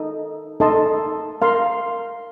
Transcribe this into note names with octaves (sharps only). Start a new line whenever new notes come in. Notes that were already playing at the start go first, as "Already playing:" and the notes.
Already playing: D#4 A4 D#5
D#4 A4 D#5 A5 C6
A#4 F5 C6